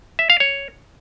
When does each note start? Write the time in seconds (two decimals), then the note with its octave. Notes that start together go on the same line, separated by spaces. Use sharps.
0.19 E5
0.30 F5
0.40 C#5